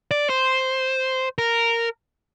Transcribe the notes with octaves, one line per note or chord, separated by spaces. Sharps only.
D5
C5
A#4